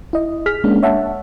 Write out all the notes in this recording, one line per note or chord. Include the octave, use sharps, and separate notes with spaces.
E4 D#5
G#4 F6 B6
G#3 A#3 C#4 D4
C#5 E5 F#5 A5